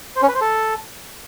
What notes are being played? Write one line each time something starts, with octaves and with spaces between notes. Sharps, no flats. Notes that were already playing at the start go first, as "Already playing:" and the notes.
C5
C#4
B4
C5
A4